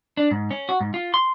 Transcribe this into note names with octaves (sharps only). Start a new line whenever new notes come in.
D4
G#2
C#4
F#4
G#2
F4
C6